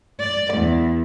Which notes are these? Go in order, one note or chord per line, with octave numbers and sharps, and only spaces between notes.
D5
E2